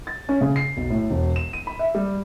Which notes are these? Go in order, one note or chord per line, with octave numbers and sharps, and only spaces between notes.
A6
C#4
C#3
C7
B1
A2
E1
E7
D#7
B5
E5
G3